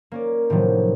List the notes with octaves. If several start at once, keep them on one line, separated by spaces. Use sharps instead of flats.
A#3 C#4 D5
A2 C3 D#3 F3 F#3